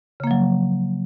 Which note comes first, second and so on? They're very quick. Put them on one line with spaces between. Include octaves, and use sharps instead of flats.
C#3 A#3 F3 F#3